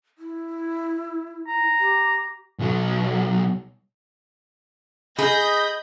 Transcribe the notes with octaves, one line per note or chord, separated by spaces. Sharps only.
E4
A#5
G4
B1 F#3
G#4 D#5 B5 G6 A#6